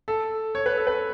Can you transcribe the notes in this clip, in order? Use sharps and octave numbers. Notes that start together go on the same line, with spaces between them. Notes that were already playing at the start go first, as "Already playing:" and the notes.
A4
C#5
B4
A4
B4